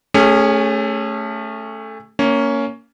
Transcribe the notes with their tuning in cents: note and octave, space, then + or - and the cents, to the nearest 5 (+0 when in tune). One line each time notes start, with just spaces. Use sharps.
A3 +0 C#4 +0 G#4 -35
A#3 -10 C#4 +10